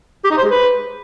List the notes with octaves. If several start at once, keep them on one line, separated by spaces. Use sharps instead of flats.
G4
D#4
C5
G#3
B4